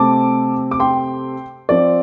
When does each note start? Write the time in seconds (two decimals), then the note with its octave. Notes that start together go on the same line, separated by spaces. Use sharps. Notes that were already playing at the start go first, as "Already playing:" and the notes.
Already playing: C3 A3 C4 A5 D6
0.71 D6
0.80 G5 C6
1.69 F3 C4 D5